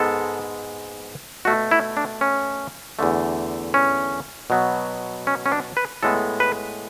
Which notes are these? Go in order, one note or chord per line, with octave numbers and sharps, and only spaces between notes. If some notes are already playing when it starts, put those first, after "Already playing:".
Already playing: G#2 G#3 B3 A4
B2 A3 F#4
E4
D4
C#4
E2 D3 A3
C#4
B2 F#3 B3
C#4
C#4
D4
B4
A2 G#3 B3 A4
B4